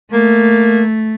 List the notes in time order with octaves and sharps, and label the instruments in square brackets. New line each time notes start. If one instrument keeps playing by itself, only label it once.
[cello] A3 [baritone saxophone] A#3